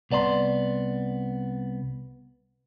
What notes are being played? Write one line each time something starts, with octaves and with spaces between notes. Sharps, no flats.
C2 B3 D5 A5 C6